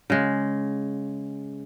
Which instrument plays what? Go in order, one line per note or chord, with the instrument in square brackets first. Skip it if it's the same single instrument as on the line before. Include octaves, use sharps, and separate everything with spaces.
[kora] C#3 G#3